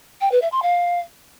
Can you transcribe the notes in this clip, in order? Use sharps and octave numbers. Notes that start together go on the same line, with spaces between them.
G5
B4
E5
C6
F5